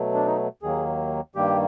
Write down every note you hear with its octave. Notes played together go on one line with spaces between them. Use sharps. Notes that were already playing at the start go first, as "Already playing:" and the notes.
Already playing: B2 F#3 A3
D4
D#4
D#2 D#3 F#3 A#3 G#4
G2 D#3 G3 A#3 G4